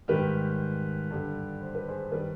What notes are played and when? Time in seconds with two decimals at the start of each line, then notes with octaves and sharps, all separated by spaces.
0.08 G#2 D#3 G3 G4 B4
1.11 G2 D3 G3
1.61 C5
1.75 B4
1.88 G#4 C5
2.12 D#3 G3 B4 D5